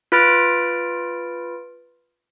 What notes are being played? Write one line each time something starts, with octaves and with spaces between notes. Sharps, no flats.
F4 B4 B5 F6 A6 D7